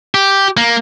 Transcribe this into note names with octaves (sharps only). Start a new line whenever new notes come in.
G4
A#3